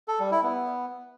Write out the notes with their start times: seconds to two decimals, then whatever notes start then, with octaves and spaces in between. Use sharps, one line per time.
0.08 A4
0.20 G3
0.31 E4
0.43 B3